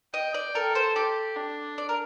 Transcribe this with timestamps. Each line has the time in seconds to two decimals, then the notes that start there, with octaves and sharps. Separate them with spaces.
0.14 D#5 G5
0.34 D5
0.55 A4 A#4
0.75 C5
0.95 G4 D5
1.36 D4
1.78 D5
1.89 A#4